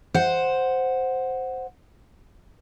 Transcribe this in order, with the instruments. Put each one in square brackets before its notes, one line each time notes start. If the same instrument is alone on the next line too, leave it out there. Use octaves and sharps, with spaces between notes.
[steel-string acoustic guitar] C5 F#5